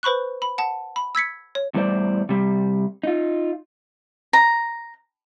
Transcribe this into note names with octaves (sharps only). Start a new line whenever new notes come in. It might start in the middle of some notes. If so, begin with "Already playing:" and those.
B4 C5 B5 C#6 F#6
B5
F#5 A5
B5
E6 G#6 B6 C#7
C#5
E2 A2 G3 C5 D5
C3 G3
D#4 F4
A#5